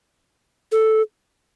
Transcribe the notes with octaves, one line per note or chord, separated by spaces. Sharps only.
A4